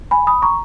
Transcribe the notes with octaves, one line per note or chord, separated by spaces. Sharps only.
G#5 B5
B5 D#6
A#5 C#6